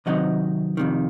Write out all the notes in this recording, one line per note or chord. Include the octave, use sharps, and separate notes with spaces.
C3 D#3 F#3 C4 D#4 D#5 F#5
F2 C3 D#3